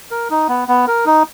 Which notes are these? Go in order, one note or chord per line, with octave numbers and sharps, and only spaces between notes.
A#4
D#4
B3
B3
A#4
D#4